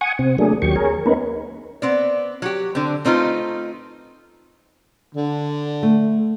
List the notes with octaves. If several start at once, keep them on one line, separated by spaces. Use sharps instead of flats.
F#5 G#5 C#6 D#6
C3 C4
F#3 A3 A#3 D4 G#4
D#2 F#3 G4 C#6
G#4 A#4 C#5
A#3 B3 C#4 D#4 A#4 B4
B3 C4 D5
F#3 F#4 G4
D3 C4
A3 C4 D#4 F4 B4
D3
A3